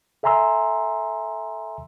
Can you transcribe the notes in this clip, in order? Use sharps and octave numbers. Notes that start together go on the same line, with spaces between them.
A4 E5 G#5 A#5 C6 E6